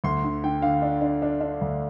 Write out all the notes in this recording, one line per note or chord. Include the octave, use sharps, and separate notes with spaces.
D2 C6
D3
D3 G5
D3 F5
D4
D4
D4
D4
D2